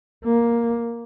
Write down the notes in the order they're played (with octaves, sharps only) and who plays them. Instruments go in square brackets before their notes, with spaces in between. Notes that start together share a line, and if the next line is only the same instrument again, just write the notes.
[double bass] A#3